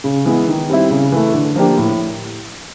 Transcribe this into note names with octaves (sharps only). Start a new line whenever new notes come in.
C#3
E3 G#3 B3
D#3
G3 C4 E4
C#3
E3 A3
D3
F3 A#3 D4 G4
A2